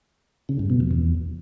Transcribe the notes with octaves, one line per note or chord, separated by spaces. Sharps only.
C#3
G2
B2
F2
E2